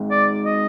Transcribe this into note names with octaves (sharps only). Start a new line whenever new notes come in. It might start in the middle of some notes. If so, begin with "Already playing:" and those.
Already playing: G#1 G#2
D5
D#5